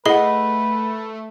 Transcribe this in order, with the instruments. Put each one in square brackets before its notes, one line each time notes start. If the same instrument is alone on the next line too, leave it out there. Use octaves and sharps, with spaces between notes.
[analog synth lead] A3 [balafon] E4 G#4 B5 [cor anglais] B4 [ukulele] D#5 F#5